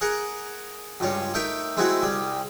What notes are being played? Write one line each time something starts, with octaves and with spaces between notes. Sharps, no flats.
G#4 A#4 F#5 A#5
C#2 G2 F4 C#5
A3 D#4 A#4 E5 G5
G#3 A3 C4 E4 F#4 G#4
C2 G3 G#4